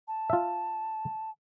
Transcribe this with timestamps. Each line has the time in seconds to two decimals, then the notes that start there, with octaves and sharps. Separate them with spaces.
0.08 A5
0.30 F4 E5